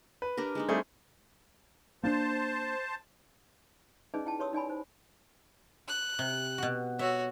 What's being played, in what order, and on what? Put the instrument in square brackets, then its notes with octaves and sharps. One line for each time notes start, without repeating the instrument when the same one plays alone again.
[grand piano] B4
[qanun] D4 G4 A#4
G#3 D4 D#4
[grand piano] G3 A3 G#4 [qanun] C4
[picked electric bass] A#3 C#4 D4 [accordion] C5 A5
[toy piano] C#4 D#4 G#4 B4 D5 D#5
E4 G5 A5
G4 B4 C#5 C6 D#6 E6
D#4 D5 G#5 B5
C5
[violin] F#6
[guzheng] C3
B2 F#4
[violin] F#4 C#5 [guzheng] E5